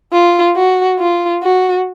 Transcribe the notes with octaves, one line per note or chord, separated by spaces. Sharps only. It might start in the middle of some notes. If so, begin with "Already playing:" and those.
F4
F#4
F4
F#4